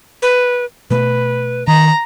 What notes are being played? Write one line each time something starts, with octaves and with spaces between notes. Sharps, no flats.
B4
B2 A3 B4
D#3 A#5